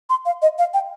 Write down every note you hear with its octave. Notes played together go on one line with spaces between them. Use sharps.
C6
F5
D#5
F5
G5